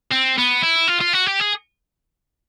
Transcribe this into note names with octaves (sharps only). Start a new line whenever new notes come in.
C4
B3
E4
F4
F4
F#4
G4
G#4